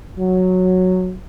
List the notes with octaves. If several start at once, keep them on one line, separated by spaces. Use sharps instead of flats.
F#3